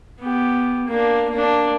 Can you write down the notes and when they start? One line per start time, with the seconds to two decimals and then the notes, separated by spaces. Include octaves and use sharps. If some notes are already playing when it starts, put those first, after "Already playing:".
0.20 B3 G4
0.87 A#3 D4
1.30 A#3 D4